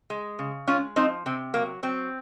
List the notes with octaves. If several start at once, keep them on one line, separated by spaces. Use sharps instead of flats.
G#3
C#3
G#3 C#4 F4
F3 C4 D#4
C3 C4
F#3 A#3
F#3 C4